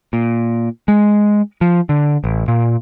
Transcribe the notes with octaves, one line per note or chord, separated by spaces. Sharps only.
A#2
G#3
F3
D3
A1
A#2